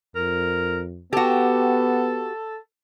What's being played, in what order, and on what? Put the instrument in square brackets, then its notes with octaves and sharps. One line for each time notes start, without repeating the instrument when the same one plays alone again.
[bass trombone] F2 [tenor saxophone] A#4
[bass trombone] B3 [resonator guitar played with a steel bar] F#4 G4 [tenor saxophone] A4